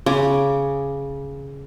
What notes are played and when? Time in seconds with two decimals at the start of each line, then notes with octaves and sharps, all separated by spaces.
0.06 C#3 G#5 D6